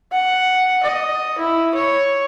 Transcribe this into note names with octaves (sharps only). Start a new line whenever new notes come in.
F#5
D#5
E4
C#5